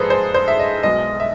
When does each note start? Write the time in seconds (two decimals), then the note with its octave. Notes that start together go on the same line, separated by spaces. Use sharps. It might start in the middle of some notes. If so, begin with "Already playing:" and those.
Already playing: G#2 F3 G#3 G#4 A4 B4 C5
0.10 C5
0.34 C5
0.48 E5
0.59 D#5
0.83 B1 B2 G#3 D#5
1.20 E5